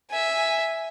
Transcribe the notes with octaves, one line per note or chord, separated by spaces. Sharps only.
E5 G#5